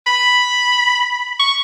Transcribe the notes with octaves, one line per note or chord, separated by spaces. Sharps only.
B5
C#6